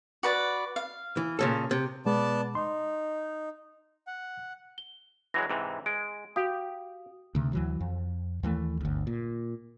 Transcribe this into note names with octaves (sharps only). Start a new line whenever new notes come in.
F#4 B4 D5
F5
E3
A#2 C#3 A4
C3
B2 G#3 B3 D5 A5
D#4 C6
F#5
G7
E3 F#3 G#3 A#6
G#2 C3 E3
G#3 D7
F#4 G4 F5 D#6
D2 C3
D2 E3 F#3
F2
D#2 E3 G3 A3
G1 D2
A#2